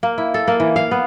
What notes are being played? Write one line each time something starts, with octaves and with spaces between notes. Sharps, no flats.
A#3
E4
A4
A#3
E3
F5
B3